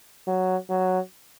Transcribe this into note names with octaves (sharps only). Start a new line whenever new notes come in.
F#3
F#3